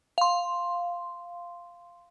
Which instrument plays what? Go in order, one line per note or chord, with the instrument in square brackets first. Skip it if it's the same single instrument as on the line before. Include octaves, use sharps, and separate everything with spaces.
[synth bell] F5 C6